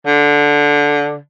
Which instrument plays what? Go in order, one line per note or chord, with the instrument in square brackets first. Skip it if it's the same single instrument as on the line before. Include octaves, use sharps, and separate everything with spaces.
[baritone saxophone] D3